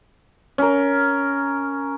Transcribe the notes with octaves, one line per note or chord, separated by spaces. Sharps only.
C#4 A#4